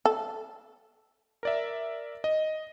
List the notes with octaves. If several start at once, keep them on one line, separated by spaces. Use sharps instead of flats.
A4
A#4 D5 E5
D#5